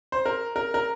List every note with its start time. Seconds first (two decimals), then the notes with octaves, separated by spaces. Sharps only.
0.12 C5
0.26 A#4
0.56 A#4
0.74 A#4